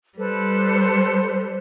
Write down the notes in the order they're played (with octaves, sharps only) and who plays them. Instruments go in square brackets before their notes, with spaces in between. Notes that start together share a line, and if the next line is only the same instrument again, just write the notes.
[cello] G3 [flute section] A4 B4 C5